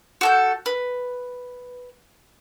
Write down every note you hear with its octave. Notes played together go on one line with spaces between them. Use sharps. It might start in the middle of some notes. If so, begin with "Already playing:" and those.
F#4 A4 G6
B4